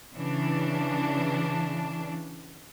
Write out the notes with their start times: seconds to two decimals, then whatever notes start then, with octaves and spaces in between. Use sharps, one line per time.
0.15 C#3 E3 D4